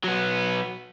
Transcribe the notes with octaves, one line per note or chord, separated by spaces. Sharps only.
F#3 B3